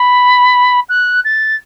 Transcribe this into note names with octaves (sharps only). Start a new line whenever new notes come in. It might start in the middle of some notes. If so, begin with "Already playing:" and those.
Already playing: B5
F#6
A6